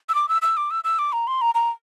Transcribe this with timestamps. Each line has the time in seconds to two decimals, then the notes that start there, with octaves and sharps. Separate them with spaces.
0.09 E6
0.15 D6
0.29 E6
0.42 E6
0.57 D6
0.71 E6
0.84 E6
0.99 D6
1.13 A#5
1.27 C6
1.41 A#5
1.55 A#5